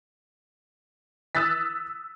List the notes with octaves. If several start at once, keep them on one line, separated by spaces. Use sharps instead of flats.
D#6 E6 F#6 A6 B6